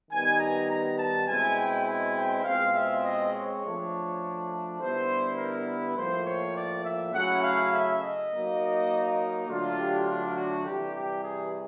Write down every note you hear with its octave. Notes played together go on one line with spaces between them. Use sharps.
D#3 G3 B3 D#4 G#5
A#5
A#5
A5
B2 G#3 C4 E4 G#5
G5
G#5
G5
B2 G#3 C4 F4 F5
E5
D#5
C#5
F3 A3 D4
D3 G3 B3 E4 C5
A#4
B4
A2 F3 A#3 C5
C#5
D5
E5
C#3 F#3 A3 C#4 E4 F#5
F5
E5
D#5
F#3 A#3 D#4
D3 F#3 A3 D4 F4
G4
F4
F#4
C3 E3 G3 G4
G4
G#4